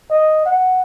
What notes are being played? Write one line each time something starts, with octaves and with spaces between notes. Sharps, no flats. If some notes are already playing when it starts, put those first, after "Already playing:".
D#5
F#5